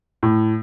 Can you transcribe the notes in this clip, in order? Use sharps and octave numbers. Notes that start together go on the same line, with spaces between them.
A2